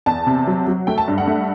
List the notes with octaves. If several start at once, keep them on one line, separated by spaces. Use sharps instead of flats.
E2 A5
C3
F#3
F#3
A3 G5
A5
G2
F#5
A3